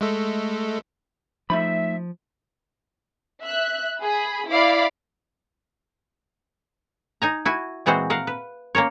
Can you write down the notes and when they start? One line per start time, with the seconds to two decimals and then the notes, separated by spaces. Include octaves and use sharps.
0.01 G#3 A3 A4
1.50 F3 A3 D#4 E5 B5
3.44 E5 F#6
4.03 G#4 B5
4.51 E4 D5 F5 B5 D6
7.22 D#4 G#5 A#5
7.45 E4 F#4 G#5
7.86 A#2 E3 G#3 C4 F#4 C5
8.10 A#4 F5 F#5
8.27 B4
8.75 A#3 C#4 A#4 C#5